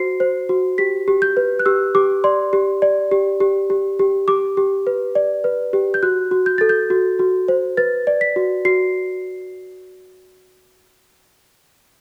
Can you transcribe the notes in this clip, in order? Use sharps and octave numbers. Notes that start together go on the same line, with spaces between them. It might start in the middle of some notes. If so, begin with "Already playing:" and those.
Already playing: F#4 C5 C7
C5
F#4
G4 B6
G4
G6
B4
F#6
G4 E6
G4 D6
D5 C6
G4
D5
G4
G4
G4
G4
G4 D6
G4
B4
D5
B4
G4
G6
F#4 F#6
F#4
G6
A4 A6
G6
F#4
F#4
C5
B4 A6
D5
B6
F#4
F#4 C7